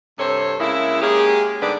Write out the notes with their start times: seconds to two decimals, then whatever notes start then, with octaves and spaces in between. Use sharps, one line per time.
0.19 G2 C3 A4 C5 C#5
0.60 C#3 G#3 A#3 E4
1.01 G#3 A#3 C#4 G4 G#4
1.61 G#2 D3 G3 G#4 B4 D5